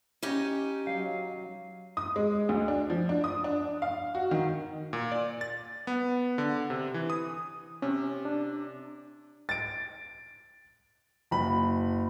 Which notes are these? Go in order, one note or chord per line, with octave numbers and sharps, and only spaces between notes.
C#4 D#4 G4
F#3 F5
D#6
G#3
D2
D4
F3
D4
D#6
D4
F5
F#4
D#3
A#2
D5
A6
B3
D3
C3
E3
D#6
C3 C#4
D4
A6 D7
F#1 B5